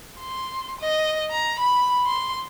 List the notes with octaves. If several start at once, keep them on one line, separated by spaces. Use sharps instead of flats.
C6
D#5
A#5
B5
C6